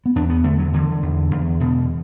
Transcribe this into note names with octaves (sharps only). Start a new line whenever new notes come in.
B3
E2 D4
B3
D3 A3
F#3
D3 E3
E2
E2
B2